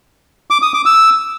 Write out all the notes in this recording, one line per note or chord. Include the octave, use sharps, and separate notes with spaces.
D6
D#6
D6
E6